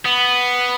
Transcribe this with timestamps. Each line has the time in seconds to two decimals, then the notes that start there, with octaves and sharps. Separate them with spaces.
0.05 B3